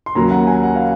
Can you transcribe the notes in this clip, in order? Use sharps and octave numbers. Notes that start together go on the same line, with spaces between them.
C6
D#2 C#3 F#3 A#3 A#5
F#5
G#5
F#5
F5